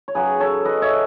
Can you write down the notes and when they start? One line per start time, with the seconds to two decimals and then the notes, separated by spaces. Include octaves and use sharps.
0.08 C#5
0.15 F#2 C#3 F#3 G#4 B4
0.40 A4 C#5
0.65 B4 D#5
0.82 C#5 E5